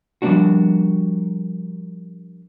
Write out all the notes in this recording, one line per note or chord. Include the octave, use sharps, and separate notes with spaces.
F3 G3 A3 A#3 D4 F#4